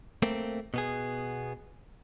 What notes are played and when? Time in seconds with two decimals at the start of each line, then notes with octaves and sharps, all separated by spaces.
0.22 A3 A#3 C4
0.74 B2 B3 G#4